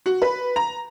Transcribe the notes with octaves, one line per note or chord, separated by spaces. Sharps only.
F#4
B4
A#5